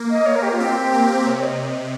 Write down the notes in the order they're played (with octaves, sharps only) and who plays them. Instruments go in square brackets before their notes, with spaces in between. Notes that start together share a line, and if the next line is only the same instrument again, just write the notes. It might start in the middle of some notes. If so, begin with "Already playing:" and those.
Already playing: [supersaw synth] A#3
[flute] D#5
C#5
A#4
G4
F4
[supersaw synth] C4 [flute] G4
[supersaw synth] A#3
[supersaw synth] C3 [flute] C#5
[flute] D#5